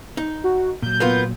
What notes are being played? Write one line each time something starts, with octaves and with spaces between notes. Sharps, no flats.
D#4
F#4
A#2 F#3 G6
A#3 B3 F4